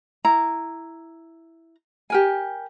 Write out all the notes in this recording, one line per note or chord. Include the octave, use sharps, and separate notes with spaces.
E4 A#5
G4 A#4 G#5